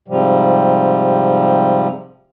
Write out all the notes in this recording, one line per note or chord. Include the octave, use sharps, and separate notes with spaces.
G#2 C3 F3 G3